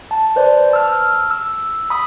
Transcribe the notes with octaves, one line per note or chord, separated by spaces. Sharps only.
A5
B4 C5 D5
A5 E6 F6
E6
B5 D#6